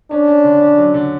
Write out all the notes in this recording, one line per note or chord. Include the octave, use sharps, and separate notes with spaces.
C#4 D4
C#4
D3
C#4
F#3
D3